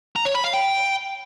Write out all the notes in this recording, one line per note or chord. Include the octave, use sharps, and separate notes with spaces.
A#5
C#5
B5
F5
G5